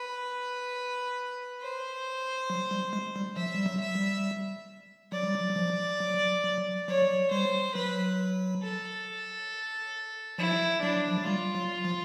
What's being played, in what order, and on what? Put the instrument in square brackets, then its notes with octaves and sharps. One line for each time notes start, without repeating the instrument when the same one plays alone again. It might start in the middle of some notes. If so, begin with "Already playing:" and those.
Already playing: [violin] B4
C5
[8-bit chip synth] F#3
G3
G#3
G3
[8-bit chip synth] F3 [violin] E5
[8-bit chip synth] G3
F#3
[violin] E5
[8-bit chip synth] G3
[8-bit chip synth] F#3 [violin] D5
[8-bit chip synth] G3
F#3
F#3
F3
F#3
F#3
[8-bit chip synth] F#3 [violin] C#5
[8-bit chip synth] G3 [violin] C5
[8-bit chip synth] F#3 [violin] B4
[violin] A4
[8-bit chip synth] F3 [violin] E4
[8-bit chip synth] F#3 [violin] D4
[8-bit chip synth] F3
F#3
[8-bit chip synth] G3 [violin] F4
[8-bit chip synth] F#3
F3